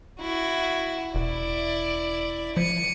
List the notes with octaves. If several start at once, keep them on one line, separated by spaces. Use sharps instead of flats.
E4 F#4
E1 E4 D5
F3 C#7 D#7